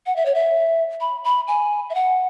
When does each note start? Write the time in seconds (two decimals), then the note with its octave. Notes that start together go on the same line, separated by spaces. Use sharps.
0.06 F#5
0.16 E5
0.26 C#5
0.35 E5
1.01 B5
1.24 B5
1.48 G#5
1.90 E5
1.95 F#5